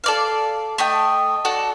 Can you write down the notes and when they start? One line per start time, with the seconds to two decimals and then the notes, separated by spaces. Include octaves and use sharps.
0.04 A4 D5 F5
0.78 A3 D#5 G5
1.45 F#4 A4 D5